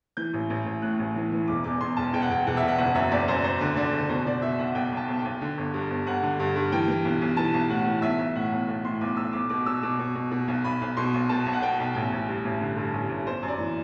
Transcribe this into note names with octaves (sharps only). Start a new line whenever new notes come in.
E3 G6
A1
A1
A1
A2 F#6
A1
E3
E3
E1 D6
E2 D6
E2 C6
E1 A5
E1 G5
F#5
E1 G5
E1 F#5
E5
E1
F#5
F#1 F#5
F#2 E5
F#1 D5
F#2 C5
F#2 C5
D3
D3 D5
F#1
B2 C5
B2 D5
B2 E5
B1 F#5
B1 G5
B1 A5
B1
G5
B1
D3
G1
G2
G1
G1 F#5
D3
G2
G2
E3 G5
E3
B1
B1
E3 A5
B1
A2 F#5
E3
B1 E5
B1
A2 F#5
B1
B1
A2 C6
B1 D6
B1 E6
B1 D6
B2 D6
B2 E6
B2 D6
B2
B2
B2
B1
B1 B5
B1
B2 C6
B1
B2 A5
B1
F#5
B2 G5
B1
A1 G5
A1
G2
A1
D3
G2
A1
A1
G1 C5
F#2
D5
E3